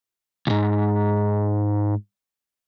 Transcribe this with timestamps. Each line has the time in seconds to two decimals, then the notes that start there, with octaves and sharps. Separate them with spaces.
0.47 C#2 G#2